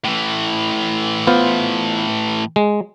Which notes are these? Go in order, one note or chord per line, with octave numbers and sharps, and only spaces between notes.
A2 E3
B3 F4 C5
G#3